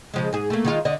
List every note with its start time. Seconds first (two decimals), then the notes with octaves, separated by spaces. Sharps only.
0.14 C#3 F3 G#3
0.33 G#2 G#4
0.50 A3 A#3
0.65 D#3 G#3 F4
0.85 D3 D5 D#5